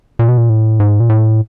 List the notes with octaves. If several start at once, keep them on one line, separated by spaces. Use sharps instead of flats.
A#2
B2
A#2
A2
G#2
A#2
A2